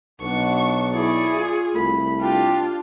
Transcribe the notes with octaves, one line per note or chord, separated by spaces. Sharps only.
B1 D4 F#4 C#6
E4 G#4 D5 C#6
F4
C2 A3 B5
D4 F4 G4